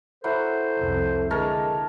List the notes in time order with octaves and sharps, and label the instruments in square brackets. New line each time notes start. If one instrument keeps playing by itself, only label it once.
[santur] F#3 E4 F#5 [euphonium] A4 [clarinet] C5
[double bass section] C2 F2
[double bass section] D3 [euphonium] G#3 [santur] A#4 C#5 A5